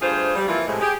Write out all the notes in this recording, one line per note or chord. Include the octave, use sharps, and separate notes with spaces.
G2 A3 F4 G#4 C5
G3
E3 F3 A#3 C4 E4 F4
A2 C3 G#3
G4 G#4